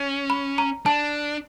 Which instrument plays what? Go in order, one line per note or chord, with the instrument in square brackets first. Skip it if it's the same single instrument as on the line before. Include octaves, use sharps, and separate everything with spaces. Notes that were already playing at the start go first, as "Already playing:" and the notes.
Already playing: [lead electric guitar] C#4
[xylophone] B5
A#5
[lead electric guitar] D4 [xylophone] A5